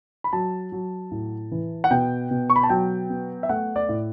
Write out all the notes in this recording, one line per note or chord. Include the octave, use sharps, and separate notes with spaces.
B5
F#3 A5
F#3
A2
E3
F#5
B2 G5
B2
C#6
B5
A5
F#3 G5
B3
E5
A3 F#5
D5
A2